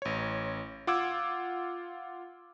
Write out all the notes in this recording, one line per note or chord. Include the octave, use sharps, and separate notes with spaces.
A1 C#5
F4 F#5 D6 E6 G#6